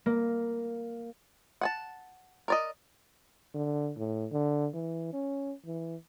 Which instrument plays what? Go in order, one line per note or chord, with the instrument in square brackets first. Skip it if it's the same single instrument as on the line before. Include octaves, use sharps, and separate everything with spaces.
[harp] A#3
[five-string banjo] F#5 G#5 A5
A#4 D5 D#5
[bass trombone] D3
A2
D3
E3
C#4
E3